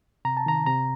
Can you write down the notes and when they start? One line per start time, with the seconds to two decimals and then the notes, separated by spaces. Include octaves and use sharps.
0.25 C3 A#5
0.37 A5
0.46 D#3 A#5
0.66 C3 A#5